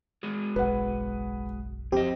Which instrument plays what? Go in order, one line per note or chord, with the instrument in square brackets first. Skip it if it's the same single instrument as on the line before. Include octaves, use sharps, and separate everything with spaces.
[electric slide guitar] G#3 F#4 G#4
[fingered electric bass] F#1 B1 [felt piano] B4 F#5
[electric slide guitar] F2 D#5 [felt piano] C4 [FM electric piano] G4